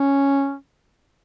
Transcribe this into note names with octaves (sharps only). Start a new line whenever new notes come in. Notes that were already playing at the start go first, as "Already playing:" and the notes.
Already playing: C#4